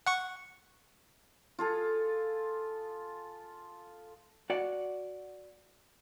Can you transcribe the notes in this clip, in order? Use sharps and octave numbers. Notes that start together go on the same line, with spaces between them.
F#5 C#6
F4 G#4 A4
F#4 D5 F#5